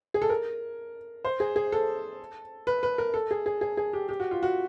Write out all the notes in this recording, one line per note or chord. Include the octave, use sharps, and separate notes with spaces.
G#4
A4
A#4
C5
G#4
G#4
A4
B4
B4
A#4
A4
G#4
G#4
G#4
G#4
G4
G4
F#4
F4
F#4